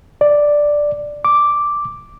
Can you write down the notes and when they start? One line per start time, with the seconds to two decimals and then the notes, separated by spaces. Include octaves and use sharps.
0.21 D5
1.25 D6